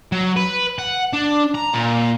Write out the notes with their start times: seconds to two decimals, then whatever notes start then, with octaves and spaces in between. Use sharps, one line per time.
0.12 F#3
0.37 B4
0.79 F#5
1.13 D4
1.55 A#5
1.74 A#2